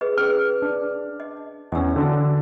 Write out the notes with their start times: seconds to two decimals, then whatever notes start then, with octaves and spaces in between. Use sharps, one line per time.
0.01 G#4 B4 D#5
0.18 C#4 G#4 B4 F6
0.62 D4
1.20 D#5
1.72 E2 C#4 D#5 E6
1.96 D3 C#4 D4 F#4 E6